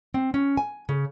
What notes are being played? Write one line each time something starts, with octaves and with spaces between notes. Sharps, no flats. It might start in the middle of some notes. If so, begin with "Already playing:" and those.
C4
C#4
G#5
C#3